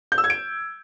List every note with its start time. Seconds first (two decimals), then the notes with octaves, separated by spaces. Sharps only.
0.12 G6
0.18 E6
0.24 G#6
0.30 D7